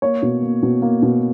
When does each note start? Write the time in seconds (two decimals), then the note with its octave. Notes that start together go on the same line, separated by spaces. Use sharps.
0.02 A#3 C#5
0.22 B2
0.42 A#3
0.62 B2
0.82 A#3
1.02 B2